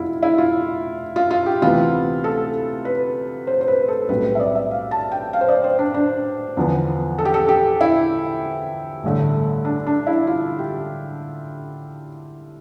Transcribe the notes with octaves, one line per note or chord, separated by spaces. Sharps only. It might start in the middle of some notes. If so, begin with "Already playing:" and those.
Already playing: F1 B2 E4 F4
E4
F4
F4
F4
G4
D2 C3 E3 B3 F4
A4
B4
C5
C5
B4
A4
B1 A2 G3 C4 B4
B4
E5
D5
E5
F5
A5
G5
F5
C5
D5
C5
D4
D4
E2 D3 F3 B3
A4
G4
A4
G4
E4
A1 G2 D3 A3
D4
D4
E4
F4
G4